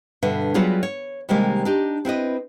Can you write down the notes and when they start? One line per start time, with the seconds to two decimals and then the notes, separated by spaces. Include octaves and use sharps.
0.22 G2 B2 D3 E5
0.54 F#3 G3 B3 F4 F#4 G#4
0.83 C#5
1.29 C3 D#3 G3 G#3 A#3
1.65 D4 D#4 G4
2.05 C4 E4 B4 D#5